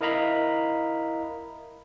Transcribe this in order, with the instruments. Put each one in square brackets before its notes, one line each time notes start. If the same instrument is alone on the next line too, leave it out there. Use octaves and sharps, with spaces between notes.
[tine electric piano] E4 A#4 D#5 F5 A#5 B5